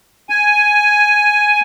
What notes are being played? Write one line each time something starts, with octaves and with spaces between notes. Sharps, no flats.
G#5